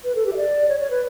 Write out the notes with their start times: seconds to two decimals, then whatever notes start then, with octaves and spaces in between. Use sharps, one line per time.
0.04 B4
0.15 A4
0.26 G4
0.33 E5
0.36 D5
0.69 C#5
0.80 C#5
0.90 B4